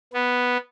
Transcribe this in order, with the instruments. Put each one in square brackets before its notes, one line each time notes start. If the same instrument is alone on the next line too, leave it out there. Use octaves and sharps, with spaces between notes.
[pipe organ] B3